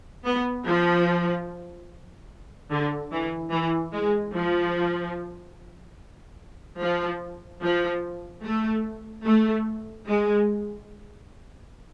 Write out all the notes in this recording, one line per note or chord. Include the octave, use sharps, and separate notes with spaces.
B3
F3
D3
E3
E3
G#3
F3
F3
F3
A3
A3
G#3